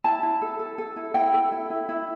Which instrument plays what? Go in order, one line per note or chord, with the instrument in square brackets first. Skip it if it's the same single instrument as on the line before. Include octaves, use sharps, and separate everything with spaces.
[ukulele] E4 A5
E4
A4
A4
A4
E4
E4 G5
A4
E4
E4
E4